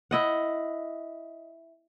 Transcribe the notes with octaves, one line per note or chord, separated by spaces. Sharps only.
E4 D#5 F#5